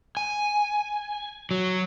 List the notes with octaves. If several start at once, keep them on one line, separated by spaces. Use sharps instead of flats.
G#5
F#3